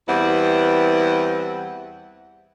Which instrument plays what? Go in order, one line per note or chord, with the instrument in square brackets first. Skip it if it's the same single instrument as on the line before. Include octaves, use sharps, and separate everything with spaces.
[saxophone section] E2 G3 C4 E4 B4 F#5